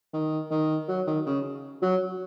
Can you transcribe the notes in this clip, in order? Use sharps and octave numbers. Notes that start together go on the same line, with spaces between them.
D#3
D#3
F#3
D#3
C#3
F#3